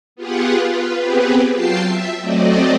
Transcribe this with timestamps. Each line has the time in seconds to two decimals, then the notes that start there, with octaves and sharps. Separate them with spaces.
0.16 B3 F4 G4 G#4 F#5
0.58 F4 B4
0.98 B3 C4 G4 G#4 B4
1.53 F#3 F4 G5 A5 C7
1.82 E5
2.21 F#3 A3 C4 D5 D#5